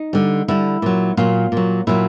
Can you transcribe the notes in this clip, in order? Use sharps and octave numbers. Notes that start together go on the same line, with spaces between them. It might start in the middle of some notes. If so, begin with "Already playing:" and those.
Already playing: D#4
D3 G3
D3 G3 E4
A#2 F#3
A#2 F#3 F4
A#2 F#3
A#2 F#3 E4